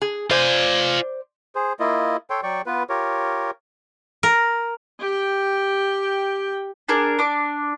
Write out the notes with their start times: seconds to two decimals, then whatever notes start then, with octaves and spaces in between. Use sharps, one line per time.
0.02 G#4
0.31 F4 C5 D5 G#5
1.55 G#4 C5
1.80 A#3 E4 F4 D#5
2.30 A4 C#5 G5 C6
2.43 F#3 D5 G5 C#6
2.66 B3 F4 B4
2.89 F4 G4 A#4 C#5
4.23 A#4
5.00 G4 G5
6.89 D4 G#4 A#4
7.19 D4 D6